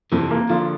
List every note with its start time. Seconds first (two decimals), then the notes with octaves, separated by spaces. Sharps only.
0.12 F2 C3 E3
0.31 A#3
0.49 D3 F3 F4